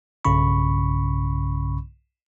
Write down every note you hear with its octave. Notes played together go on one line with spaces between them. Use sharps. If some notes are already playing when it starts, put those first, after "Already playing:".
B1 G2 C#3 C#4 B5 C#6